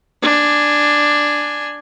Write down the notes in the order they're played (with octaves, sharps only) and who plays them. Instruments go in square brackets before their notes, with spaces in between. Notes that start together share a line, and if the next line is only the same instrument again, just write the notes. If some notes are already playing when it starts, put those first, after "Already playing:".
[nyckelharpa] D4 G#5